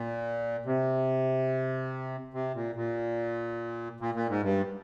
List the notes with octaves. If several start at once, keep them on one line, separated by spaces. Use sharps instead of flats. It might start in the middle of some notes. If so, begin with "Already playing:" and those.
Already playing: A#2
C3
C3
A#2
A#2
A#2
A#2
G#2
G2